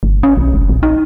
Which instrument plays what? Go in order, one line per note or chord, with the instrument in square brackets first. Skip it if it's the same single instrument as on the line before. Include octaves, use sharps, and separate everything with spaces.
[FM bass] G1
C#4
B1
F#1
A#1
D#4